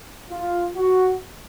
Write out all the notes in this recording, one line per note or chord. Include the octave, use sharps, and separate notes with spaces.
F4
F#4